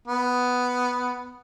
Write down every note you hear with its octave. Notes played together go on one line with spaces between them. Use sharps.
B3